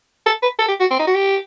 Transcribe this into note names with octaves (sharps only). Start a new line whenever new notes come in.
A4
B4
A4
G4
F#4
C4
D#4
F#4
G4